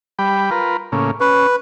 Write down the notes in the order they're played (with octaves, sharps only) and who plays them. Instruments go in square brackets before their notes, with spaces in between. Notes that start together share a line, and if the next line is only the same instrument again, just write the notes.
[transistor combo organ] G3 G5 B5
F4 A#4 B4
A2 C#3 A#3
[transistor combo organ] C#4 [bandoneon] B4